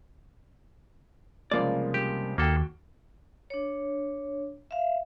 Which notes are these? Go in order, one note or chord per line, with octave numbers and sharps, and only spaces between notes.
C2 C#3 F3 G#3 A#3 D5
G4
D#2 A#3 F#4 A4 G5
D4 C#5
E5 F5